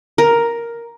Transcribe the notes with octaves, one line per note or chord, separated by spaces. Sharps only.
A#4